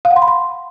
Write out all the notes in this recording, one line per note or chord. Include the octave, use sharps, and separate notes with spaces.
F5
F#5
C6
B5
C6